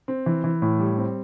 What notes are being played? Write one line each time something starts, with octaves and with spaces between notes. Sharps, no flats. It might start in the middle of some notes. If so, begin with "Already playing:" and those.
C4
E3
E3
A2
G3
C4